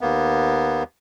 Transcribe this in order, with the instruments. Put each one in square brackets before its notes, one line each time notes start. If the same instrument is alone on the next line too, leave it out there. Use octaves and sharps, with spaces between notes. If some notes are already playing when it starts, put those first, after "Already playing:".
[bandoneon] D#2 A#3 B3